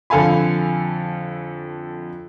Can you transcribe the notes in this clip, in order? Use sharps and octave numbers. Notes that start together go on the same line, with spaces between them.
F2 D3 A4 F5 G#5 B5